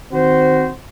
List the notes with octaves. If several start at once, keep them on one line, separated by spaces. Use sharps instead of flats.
D#3 C4 F#4 C5